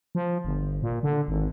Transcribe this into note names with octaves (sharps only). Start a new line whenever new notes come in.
F3
G1
A#2
D3
G#1